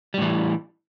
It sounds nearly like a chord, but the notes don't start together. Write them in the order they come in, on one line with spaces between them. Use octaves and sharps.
G3 A2 E3